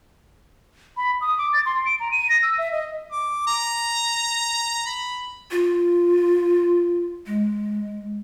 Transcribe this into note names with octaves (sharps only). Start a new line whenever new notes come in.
B5
D#6
D6
A6
C6
D7
A#5
D#7
A#6
E6
E5
D#5
D6
A#5
B5
F4
G#3